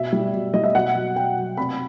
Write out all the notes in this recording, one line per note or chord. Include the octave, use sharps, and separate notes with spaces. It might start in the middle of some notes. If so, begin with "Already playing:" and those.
Already playing: B2 E5
G3
B2
G3 D#5
E5
B2 F#5
F#3
B2 G5
F#3
C3 B5